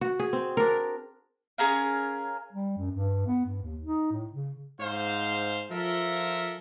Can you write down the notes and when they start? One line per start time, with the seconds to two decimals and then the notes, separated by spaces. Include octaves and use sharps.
0.01 F#4
0.19 G#4
0.33 C4
0.57 D4 A#4
1.58 C#4 G#4 A#4 F5
2.52 G3
2.77 F#2
2.91 G2
3.27 B3
3.45 G2
3.62 D#2
3.81 D#4
4.12 A2
4.33 C#3
4.80 G#2 C5 F5
5.71 F3 F4 A4 A#4 E5